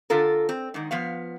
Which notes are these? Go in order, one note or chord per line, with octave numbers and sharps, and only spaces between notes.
D3 F4 A4 A#4
C4
G#2 D#3
F3 B3 F5